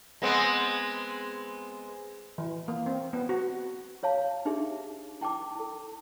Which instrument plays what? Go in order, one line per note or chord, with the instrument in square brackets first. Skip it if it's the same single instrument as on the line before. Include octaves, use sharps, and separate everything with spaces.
[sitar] G#3 B3 C4
[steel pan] E3
A#3
C4
B3
F#4
[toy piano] F4 C#5 F5 A5
D4 D#4 G4 G#4 E5
E4 G5 A5 D6
E4 A4